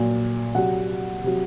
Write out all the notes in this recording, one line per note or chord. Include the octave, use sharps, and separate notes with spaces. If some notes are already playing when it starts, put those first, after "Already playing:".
Already playing: A#2 F#3
C3 F#3 F#5
C3 F#3